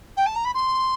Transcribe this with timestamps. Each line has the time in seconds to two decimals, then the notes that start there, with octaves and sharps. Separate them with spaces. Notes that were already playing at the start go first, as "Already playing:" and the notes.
0.16 G5
0.26 A5
0.35 A#5
0.44 B5
0.54 C6